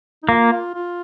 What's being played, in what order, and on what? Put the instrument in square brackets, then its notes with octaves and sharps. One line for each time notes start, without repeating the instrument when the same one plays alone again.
[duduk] D#4
[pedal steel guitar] A#3 [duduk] F4
[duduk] F4